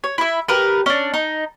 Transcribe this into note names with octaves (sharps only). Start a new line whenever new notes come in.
C#5
E4 E5
G4 A#4 B4
C#4 D4
D#4